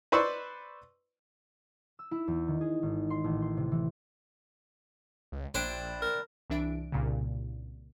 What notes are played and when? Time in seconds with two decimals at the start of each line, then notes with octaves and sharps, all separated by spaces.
0.12 B4 C5 D5 C#6 E6
1.99 E6
2.11 E4
2.28 E2
2.48 D#3
2.61 G#4
2.83 G#1
3.10 C6
3.24 A1
3.42 C6
3.57 C3
3.72 E3
5.32 C#2
5.55 A#1 D4 E4 C5 G5
6.02 A#4
6.50 C2 E3 D4 E5 D7
6.92 C2 A#2 C#3